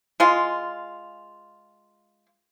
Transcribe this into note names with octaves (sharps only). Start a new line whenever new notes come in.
G#3 F4